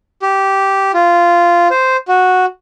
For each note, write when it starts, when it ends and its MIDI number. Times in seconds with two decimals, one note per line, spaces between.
0.22 0.92 67
0.94 1.68 65
1.71 1.97 72
2.08 2.45 66